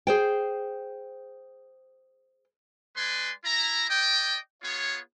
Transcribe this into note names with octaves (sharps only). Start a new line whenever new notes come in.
G#4 C5 G5
G#3 B4 D5 G#5 C6
E4 A#5
D5 D#5 G5
B3 F4 G#4 C#5